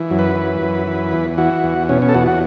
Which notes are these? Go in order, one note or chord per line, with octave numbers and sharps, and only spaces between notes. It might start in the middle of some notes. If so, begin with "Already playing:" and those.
Already playing: E3
F#2
B4
E3
F#2
E3
E2
E3 F#4
E2
B2 C#4
C#4
A4
E2 F#4
F#4